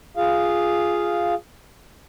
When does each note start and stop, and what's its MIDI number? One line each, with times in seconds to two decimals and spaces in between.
0.17 1.34 65
0.17 1.34 68
0.17 1.34 77